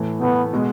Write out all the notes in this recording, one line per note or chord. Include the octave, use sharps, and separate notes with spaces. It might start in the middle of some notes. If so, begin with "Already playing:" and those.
Already playing: A2 E3 A3
A2 E3 A3 B3
B2 G#3